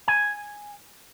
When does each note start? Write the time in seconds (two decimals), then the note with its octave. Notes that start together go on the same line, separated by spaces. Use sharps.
0.08 G#5